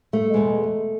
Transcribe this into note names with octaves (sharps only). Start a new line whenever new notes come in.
A3
E2 B2 G#3